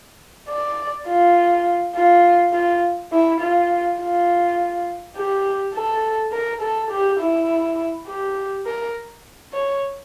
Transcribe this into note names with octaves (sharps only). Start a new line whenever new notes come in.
D5
F4
F4
F4
E4
F4
F4
G4
A4
A#4
A4
G4
E4
G4
A#4
C#5